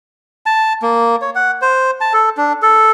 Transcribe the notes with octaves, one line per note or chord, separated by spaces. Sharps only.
A5
A#3
C#5
F#5
C5
A5
A4
D4
A4